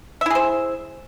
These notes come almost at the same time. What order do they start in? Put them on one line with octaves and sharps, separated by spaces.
E5 E4 G#4 C5